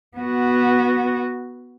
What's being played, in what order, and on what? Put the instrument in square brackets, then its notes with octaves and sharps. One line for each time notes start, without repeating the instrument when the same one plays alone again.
[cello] B3 F#4